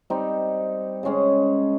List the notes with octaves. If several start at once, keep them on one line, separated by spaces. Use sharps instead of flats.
G3 C4 D#4
C#3 G#3 C#4 G#4